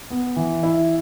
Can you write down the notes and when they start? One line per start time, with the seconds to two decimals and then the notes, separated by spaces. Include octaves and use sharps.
0.11 B3
0.36 E3
0.63 E4